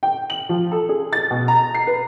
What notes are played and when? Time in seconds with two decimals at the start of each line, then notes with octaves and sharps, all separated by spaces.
0.03 G5
0.30 F#7
0.49 F3
0.72 A4
0.89 G#4
1.13 A6
1.30 B2
1.48 A#5
1.75 C7
1.87 B4